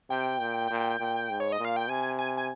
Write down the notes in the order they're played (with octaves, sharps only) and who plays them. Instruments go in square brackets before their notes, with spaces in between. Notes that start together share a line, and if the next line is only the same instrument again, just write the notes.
[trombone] C3 [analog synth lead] G5
[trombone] A#2
A#2
A#2
G#2
[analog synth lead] C#5
D#5
[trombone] A#2
[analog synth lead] F5
G5
[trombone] C3 [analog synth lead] G#5
[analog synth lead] G#5
G#5